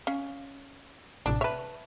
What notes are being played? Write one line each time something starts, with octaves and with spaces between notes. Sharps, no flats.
C#4 F5
A1 A2 C3 D4
B4 C#5 E5 A5